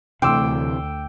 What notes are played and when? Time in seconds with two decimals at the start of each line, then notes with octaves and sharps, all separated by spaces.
0.22 D2 C3 E3 G5 C6 D6 E6